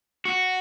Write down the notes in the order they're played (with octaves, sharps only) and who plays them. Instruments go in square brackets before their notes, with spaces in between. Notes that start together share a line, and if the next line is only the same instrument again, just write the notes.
[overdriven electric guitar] F#4